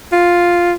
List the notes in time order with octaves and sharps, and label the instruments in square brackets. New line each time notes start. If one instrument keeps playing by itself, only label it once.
[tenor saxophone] F4